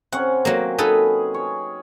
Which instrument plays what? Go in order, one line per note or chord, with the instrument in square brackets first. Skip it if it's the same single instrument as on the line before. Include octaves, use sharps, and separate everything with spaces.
[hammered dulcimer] C3 C#4 [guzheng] F#5
[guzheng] F#3 A#3
[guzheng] D#4 A4 B4 [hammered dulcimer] G#4
[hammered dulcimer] C#5